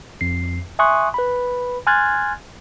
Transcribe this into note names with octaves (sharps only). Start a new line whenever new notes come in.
F2 C7
E5 G#5 C6 C#6 D#6 F#6
B4 B5
G#5 C6 F6 F#6 G#6 A6